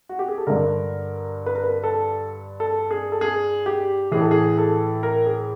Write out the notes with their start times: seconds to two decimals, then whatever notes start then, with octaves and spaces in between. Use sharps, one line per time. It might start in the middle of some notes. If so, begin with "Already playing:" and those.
0.09 F#4
0.19 G4
0.28 G#4
0.38 A4
0.47 G2 D3 A#4
1.46 B4
1.55 A#4
1.64 B4
1.84 A4
2.60 A4
2.91 G#4
3.12 A4
3.21 G#4
3.66 G4
4.11 A2 E3 G#4
4.21 A4
4.31 G#4
4.58 A4
5.03 A#4
5.26 G#4